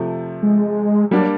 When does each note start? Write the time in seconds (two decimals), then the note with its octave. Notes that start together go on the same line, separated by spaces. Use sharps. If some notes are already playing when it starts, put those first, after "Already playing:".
Already playing: C3 F3 A3
0.43 G#3
1.11 F#3 G3 A#3 D4